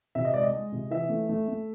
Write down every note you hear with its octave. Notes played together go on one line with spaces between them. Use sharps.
C3 E5
D#5
G#3 D5
D#5
G#3
C3
E3 E5
A3
A3
A3